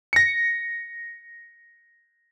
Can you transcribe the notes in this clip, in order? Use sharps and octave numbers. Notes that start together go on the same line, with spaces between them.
A#6 C#7